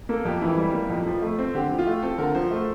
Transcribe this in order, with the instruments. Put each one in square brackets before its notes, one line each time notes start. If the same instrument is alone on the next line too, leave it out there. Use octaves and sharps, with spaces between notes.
[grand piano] A#3 [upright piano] A4
[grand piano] F2 [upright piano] G4
[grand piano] E3 [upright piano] E4
[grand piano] G3
A#3
F2
F3
A3
C4
[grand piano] D3 [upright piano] G4
[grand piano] F3
[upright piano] F4
[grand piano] A3
[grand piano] C4 [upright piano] A4
[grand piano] D3 [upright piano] A#4
[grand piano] F3 [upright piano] C5
[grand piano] A3